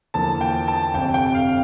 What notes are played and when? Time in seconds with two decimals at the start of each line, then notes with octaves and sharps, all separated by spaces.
0.14 E2 D3 F3 A#3 A5
0.41 G5
0.68 A5
0.94 G1 F2 C3 G5
1.14 G5
1.34 F5